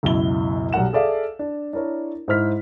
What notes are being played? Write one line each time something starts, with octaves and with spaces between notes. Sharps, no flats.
C#2 F#2 B2 E4 G7
B1 G3 A#4 F#5 E7
G#4 A4 D5 E5 F5
D4
D4 E4 A#4 C#5
G#2 E4 C5 F6 B6